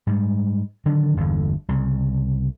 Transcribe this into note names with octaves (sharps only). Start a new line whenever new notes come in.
G#2 G3
D3 D#3 F#3 D4
G1 E2 G2 D3
C2 C#3